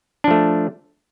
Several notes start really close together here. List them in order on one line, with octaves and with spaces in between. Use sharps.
D4 F3 A3